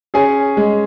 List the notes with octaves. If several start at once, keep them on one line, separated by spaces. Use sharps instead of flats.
C#4 G#4 G#5
G#3